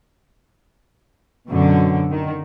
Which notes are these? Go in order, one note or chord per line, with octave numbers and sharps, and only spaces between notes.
F#2 B2 D3
D#3